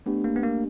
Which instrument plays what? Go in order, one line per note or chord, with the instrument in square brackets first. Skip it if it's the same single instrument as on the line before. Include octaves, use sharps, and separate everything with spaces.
[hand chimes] A3 D4 G4 [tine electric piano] B3
[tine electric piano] A#3
B3
A#3